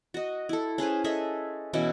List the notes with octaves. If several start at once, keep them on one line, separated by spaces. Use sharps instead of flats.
F#4 D#5
E4 A4
C#4 G#4 B4 C5
G#4 A4 D#5 E5
B2 E3 C#4 E4